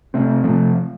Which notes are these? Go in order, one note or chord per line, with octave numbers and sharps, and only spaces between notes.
C3 A3 C4
C3 F3 A3